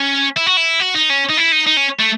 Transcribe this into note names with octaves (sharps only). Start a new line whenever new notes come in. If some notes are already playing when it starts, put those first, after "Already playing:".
Already playing: C#4
E4
F#4
E4
F#4
D#4
C#4
D#4
E4
D#4
D#4
C#4
A3